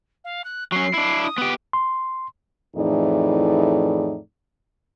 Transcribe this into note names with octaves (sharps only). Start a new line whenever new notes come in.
F5
F#6
F#3 C#4 C7
D4 E4
D#6
B3 G4
C6
F2 A2 E3 D#4 G#4 D5